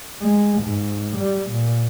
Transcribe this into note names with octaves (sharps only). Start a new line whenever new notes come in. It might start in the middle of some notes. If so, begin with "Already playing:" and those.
G#3
G#2
G3
A#2